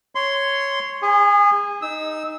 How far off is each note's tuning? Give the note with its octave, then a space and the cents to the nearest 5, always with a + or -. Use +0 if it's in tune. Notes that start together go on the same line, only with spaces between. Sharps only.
C#5 +0 C6 -10
G#4 -30 G#5 +0
D#4 +0 E6 -20